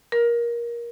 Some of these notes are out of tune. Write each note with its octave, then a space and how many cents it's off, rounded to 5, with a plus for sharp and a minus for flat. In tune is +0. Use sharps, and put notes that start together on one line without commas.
A#4 +20